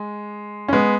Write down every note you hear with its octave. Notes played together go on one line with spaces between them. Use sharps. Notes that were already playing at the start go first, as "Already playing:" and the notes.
Already playing: G#3
C#4
G#3 B3